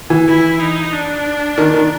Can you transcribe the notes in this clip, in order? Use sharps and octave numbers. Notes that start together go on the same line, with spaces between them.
E3
E4
D#4
D4
D#3
D#3